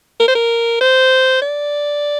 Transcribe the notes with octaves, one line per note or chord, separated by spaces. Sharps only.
A#4
C5
A#4
C5
D5